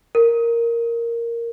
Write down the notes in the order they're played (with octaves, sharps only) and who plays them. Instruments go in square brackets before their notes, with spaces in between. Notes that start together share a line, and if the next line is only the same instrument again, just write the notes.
[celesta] A#4